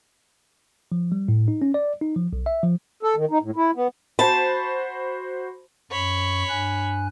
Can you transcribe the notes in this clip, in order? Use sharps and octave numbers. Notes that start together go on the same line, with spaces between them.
F3
G3
A2
D#4
C#4
D5
D#4
F3
B1
E5
F3
A4
D#3
D#4
A2
E4
B3
F#4 C5 A5 B5
F#2 C#5 B5 C#6
G2 G#5 F#6